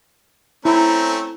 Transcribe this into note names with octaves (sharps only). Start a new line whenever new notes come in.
A3 C4 C#4 E4 A#5